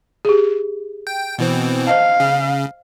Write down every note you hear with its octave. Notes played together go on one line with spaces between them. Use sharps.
G4 G#4
G5
B2 E3 C4
C5 D#5 F5 A5
C#3